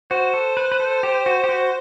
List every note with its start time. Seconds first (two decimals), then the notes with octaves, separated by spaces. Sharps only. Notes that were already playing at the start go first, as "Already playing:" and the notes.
0.11 F#4 C5
0.34 A4
0.57 B4
0.72 B4
0.80 A4
1.03 G4
1.26 F#4
1.44 G4
1.49 F#4